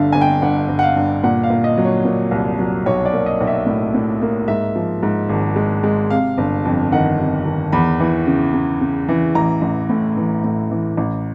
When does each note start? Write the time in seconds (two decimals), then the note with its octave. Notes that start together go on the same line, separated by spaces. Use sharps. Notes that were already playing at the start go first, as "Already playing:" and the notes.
Already playing: G1 D3 E5 F5
0.12 G1 G#5
0.21 G5
0.42 G1 F#5
0.69 G1
0.79 F#5
0.83 F5
0.96 G2
1.23 A#2 F#5
1.43 F5
1.50 A#2
1.64 D#5
1.77 F#3
1.84 C#5
2.05 A#2
2.31 C2
2.59 F#3
2.86 B1 C#5
3.06 D5
3.13 A#3
3.26 D#5
3.41 B1
3.47 E5
3.66 A2
3.94 A2
4.22 A#3
4.48 G#2 E5
4.75 F3
5.03 G#2
5.29 G#1
5.56 G#3
5.83 G#3
6.10 C3 F5
6.38 G1
6.65 F2
6.92 D#3 F#5
7.19 C3
7.45 D#3
7.72 E2 B5
8.00 E3
8.27 C#3
8.54 C#3
8.81 C#3
9.09 E3
9.35 A1 A#5
9.62 A1
9.90 A2
10.17 E3
10.44 A2
10.71 E3
10.97 A1